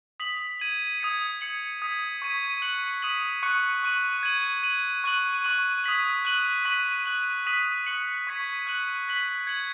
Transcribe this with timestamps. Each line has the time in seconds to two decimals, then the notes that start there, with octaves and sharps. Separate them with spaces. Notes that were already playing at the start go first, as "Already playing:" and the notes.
0.20 D#6 B6 F#7
0.60 G#6 D#7 F#7
1.00 D#6 G#6 C#7
1.41 G#6 C#7 F#7
1.82 D#6 G#6 B6
2.22 C#6 G#6 B6 D#7
2.62 F#6 C#7 F#7
3.02 D#6 B6 D#7 F#7
3.43 C#6 F#6 C#7
3.83 C#6 F#6 D#7 F#7
4.23 G#6 D#7 F#7
4.63 G#6 D#7 F#7
5.04 C#6 F#6 D#7 F#7
5.44 C#6 F#6 D#7 F#7
5.84 D#6 G#6 B6 F#7
6.25 F#6 D#7 F#7
6.65 C#6 F#6 B6 D#7 F#7
7.06 F#6 D#7 F#7
7.46 D#6 F#6 B6 D#7 F#7
7.86 C#6 F#6 C#7 F#7
8.27 C#6 G#6 B6
8.67 F#6 D#7 F#7
9.08 F#6 B6 F#7
9.47 G#6 C#7 F#7